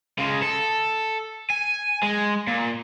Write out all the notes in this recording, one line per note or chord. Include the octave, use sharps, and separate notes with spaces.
C#3 G#3
A4
G#5
G#3
A#2